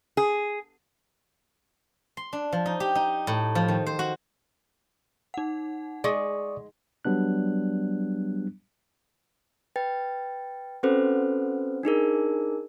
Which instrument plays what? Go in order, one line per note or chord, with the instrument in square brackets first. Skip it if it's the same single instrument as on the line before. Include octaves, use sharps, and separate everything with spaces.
[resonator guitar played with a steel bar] G#4
[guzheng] C6
D4
F3
D#4
G4
D#4
A2
F3
D#3
C5
F#4
[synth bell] D#4 F#5
[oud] G#3 [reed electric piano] D5 C#6 D#6
[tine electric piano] F#3 G3 B3 D4 F#6
[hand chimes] B4 G5 A6
C4 C#4 F#4 A4 B4 C5
D4 D#4 G#4 A#4